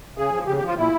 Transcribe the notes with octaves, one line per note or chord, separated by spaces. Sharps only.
C#3 G#4
F3
C#3 G4
G4
F3
F4
A#2 E4